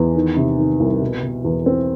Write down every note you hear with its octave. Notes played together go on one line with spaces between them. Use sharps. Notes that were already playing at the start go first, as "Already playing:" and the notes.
Already playing: E2
D#3
C3
D#3
C2
B2
B2
E2
C4